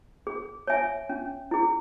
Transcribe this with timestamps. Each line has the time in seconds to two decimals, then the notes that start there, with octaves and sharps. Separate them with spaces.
0.27 G#4
0.67 C#5 E5 G#5
1.09 C#4
1.51 E4 G#4